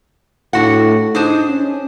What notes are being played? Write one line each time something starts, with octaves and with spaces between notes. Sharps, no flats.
A2 D4 F#4 F#5
D4 D#4 G#4 C5
C#4